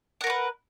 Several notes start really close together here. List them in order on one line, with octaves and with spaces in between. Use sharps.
F#5 A#4 C#5 B4